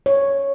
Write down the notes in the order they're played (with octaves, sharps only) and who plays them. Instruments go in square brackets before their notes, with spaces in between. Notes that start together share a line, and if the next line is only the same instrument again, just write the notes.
[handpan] C#5